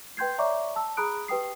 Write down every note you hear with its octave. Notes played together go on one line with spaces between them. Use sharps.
B4 G5 C6 G6 G#6 C7
C#5 D5 E5 A#5 C#6 D6
A5 E6
G#4 A#5 B5 D#6 F#6 D7
G4 B4 G5 D#6 C7